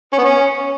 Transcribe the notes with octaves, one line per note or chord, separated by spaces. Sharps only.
C#4
B3
C#4